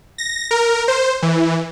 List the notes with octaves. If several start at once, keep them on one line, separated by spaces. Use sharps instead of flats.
A#6
A#4
C5
E3